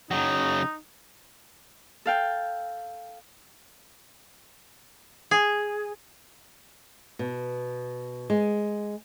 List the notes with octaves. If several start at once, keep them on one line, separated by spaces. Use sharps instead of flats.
C#3 F#3 D#4
A4 F5 G5
G#4
B2
G#3